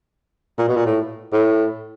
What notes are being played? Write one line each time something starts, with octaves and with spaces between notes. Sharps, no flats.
A#2
B2
A#2
A2
A2